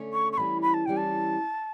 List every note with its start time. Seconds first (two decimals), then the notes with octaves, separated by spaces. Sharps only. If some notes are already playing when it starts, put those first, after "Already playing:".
Already playing: D3 A3 C#4
0.13 C#6
0.32 C#6
0.38 E3 G3 C#4 B5
0.62 B5
0.74 A5
0.86 E3 G3 C#4 G5
0.97 A5